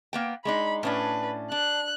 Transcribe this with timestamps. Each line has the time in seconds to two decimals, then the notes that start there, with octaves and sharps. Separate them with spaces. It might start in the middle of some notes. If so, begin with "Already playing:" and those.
0.13 A#3 B3 G5
0.45 G#3 D4 D#4 B5
0.83 A2 C#4 D4 B4
1.52 D4 F#6